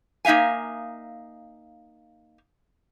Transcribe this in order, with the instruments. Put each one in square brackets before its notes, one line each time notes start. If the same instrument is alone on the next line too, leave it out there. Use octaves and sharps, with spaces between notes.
[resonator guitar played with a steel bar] A#3 D#4 E5 F5 G#5